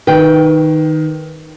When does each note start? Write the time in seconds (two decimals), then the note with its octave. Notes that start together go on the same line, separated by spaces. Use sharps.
0.07 D#3 B4 G5